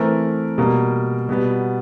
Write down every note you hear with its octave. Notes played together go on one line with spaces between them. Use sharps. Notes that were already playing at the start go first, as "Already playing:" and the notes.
Already playing: E3 A3 C4 A#4
B2 G3 A#3
B2 G3 B3